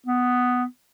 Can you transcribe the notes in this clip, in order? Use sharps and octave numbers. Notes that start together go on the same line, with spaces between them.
B3